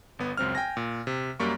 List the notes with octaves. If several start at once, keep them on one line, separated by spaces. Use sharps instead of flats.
G1 B3
C#2 F#2 C4 F6
G5 G#5 A#6
A#2
C3
F#2 G3 A#3 C#6